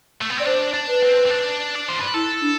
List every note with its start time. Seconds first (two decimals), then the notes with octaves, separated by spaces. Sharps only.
0.22 A3
0.30 B3
0.37 C4 D5
0.45 D4 C5
0.73 D4
0.88 B4
1.02 C4
1.26 C4
1.30 D4
1.75 D5
1.88 C5
2.00 B4
2.14 E4 A4
2.42 D4